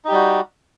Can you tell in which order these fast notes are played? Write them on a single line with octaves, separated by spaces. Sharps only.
D#4 G4 G3 F#4